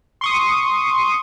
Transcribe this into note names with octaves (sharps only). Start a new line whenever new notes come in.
C6 C#6 D#6